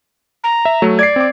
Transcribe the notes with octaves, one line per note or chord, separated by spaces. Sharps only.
A#5
E5
F#3 A3
D5 G#6 C7
C4 D6